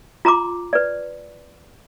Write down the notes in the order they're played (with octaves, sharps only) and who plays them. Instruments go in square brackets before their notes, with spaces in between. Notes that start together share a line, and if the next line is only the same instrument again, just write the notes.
[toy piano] F4 A#5 C6 D6
B4 D5